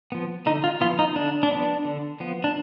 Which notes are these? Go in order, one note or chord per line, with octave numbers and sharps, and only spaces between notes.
F3 B3
D3 D#4
F4
F3 B3 F4
D#4
D3 D4
D4
F3 B3
D3
F3 B3
D4